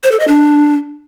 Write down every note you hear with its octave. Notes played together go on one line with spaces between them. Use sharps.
C5
A4
D#5
D4